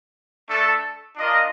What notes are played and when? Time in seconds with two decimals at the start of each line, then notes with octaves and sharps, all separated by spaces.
0.49 A3 D4 A4
1.17 D4 F4 A#4 D#5